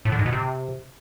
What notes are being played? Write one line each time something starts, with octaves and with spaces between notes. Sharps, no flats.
A2
D3
G#2
B2
C3